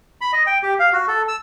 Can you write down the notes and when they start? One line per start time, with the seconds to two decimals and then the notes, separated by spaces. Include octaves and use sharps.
0.21 B5
0.33 D#5
0.47 G5
0.63 G4
0.79 F5
0.93 F#4
1.08 A4
1.28 E6